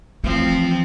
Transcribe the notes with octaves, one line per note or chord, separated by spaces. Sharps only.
E3 F3 A3 C4